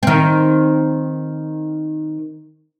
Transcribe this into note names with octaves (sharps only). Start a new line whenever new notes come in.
D#3 C4